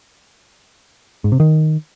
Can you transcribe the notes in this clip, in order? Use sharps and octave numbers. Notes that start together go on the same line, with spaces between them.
G#2
C3
D#3